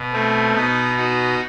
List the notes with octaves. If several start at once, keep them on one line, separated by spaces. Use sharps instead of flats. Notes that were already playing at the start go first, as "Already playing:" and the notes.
Already playing: B2
A3 C4
B2 B3 D#4
D#4 F#4